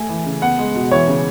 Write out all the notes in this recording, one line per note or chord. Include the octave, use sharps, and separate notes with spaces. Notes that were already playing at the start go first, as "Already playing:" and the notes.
Already playing: A3 G#5
E3
C#3
B3 F#5
G#3
B2
E3 C#5
C#3